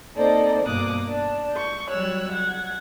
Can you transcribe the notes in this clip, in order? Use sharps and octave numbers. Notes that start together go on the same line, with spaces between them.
A#3 C4 D#4 A4 C5 D5
G2 B2 A#3 D6 D#6 F#6
D4
C#6 G6
F#3 G3 C#5 E6 F#6
F#5 G#6